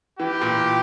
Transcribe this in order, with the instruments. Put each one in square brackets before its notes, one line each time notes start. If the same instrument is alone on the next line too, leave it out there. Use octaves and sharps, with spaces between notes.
[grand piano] E3 [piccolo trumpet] G4
[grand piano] A#2